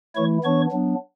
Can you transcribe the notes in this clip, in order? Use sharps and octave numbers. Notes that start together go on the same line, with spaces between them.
E3 A3 E4 C#5 C#6
E3 B3 D4 C#5 C#6
F#3 B3 D4